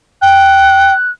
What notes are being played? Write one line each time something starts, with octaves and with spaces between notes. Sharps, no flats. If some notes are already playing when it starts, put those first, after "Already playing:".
G5 F#6